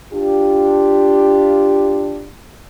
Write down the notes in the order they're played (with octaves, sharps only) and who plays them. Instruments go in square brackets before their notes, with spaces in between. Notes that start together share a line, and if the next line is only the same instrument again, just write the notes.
[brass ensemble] D4 F4 G4